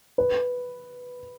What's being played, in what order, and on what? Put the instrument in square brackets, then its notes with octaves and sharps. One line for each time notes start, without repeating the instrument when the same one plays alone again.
[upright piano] B4